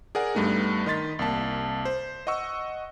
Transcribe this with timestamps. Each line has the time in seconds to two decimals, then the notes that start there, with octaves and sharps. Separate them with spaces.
0.15 G#4 A#4 D5 F#5 G#5
0.35 G2 G3 A3 B3 D#4
0.86 D#3 D#5 C6 A6 B6
1.19 C2 A#3 A5
1.85 C5
2.27 D#5 F#5 C#6 E6